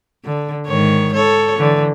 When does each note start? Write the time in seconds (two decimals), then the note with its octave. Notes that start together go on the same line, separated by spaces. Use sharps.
0.25 D3
0.67 G#2 D#3 C#5
1.13 A4 C#5
1.58 D3 E3